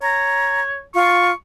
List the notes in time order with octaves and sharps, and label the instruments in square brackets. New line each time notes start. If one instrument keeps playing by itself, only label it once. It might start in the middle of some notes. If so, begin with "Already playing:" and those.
[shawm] C#5 [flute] A#5
[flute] F4 [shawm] C#6